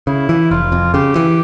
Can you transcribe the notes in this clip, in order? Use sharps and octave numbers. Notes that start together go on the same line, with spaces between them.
C#3 E4
E3
F1 F4
F2
C#3 G4
E3